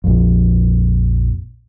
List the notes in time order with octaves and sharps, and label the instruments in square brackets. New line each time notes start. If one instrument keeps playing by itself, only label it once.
[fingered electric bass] A#1 F2